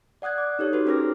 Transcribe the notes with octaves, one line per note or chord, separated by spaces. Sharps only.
D5 F#5 D#6 F#6 G#6
D6
D#4 G4 A4 C#5
D#4 F#4 B4
C#4 A#4 C5 D6 F6 A#6
G#4 B4